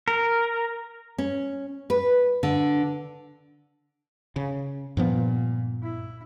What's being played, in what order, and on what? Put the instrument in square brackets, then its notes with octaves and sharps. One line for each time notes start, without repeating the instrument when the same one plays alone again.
[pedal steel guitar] A#4
[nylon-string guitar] C#4
B4
D3
[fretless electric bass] C#3
[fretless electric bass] G2 F3 B3 [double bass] A#2
[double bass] E4